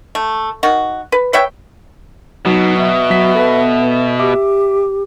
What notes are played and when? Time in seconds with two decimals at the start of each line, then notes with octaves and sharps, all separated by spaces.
0.15 A3
0.63 D#3 F#4
1.12 B4
1.33 B4 C#5 E5 G5
2.46 B2 F#3 D#4
2.78 E5
3.10 F#3 B6
3.35 A4 B4
4.19 G4 E5 D6